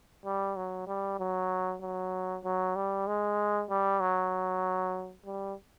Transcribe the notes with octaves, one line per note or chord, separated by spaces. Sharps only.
G3
F#3
G3
F#3
F#3
F#3
G3
G#3
G3
F#3
G3